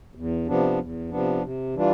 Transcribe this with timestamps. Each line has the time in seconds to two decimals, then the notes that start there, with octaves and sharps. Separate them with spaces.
0.15 E2
0.46 C3 F3 B3 D4
0.79 E2
1.11 C3 F3 B3 D4
1.43 C3
1.75 E3 G3 D4 F4